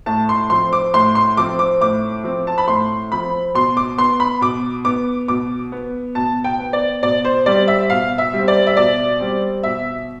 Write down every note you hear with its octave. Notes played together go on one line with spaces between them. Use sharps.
A2 A5
C6
F3 C4 C6
D6
A2 C6
C6
F3 C4 D6
D6
A2 D6
F3 C4
A5
B5
A2 C6
F3 C4 B5
B2 C6
D6
B3 C6
B5
B2 D6
B3 D6
B2 D6
B3
B2 A5
G5
B3
D5
B2 D5
C5
G3 C4 D5
E5
B2 F5
E5
G3
C4
D5
E5
B2 D5
G3 C4
B2 E5